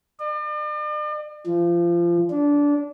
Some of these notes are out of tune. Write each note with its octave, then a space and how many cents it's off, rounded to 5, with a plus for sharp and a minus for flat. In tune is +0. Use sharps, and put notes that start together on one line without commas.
D5 +45
F3 -25
D4 -20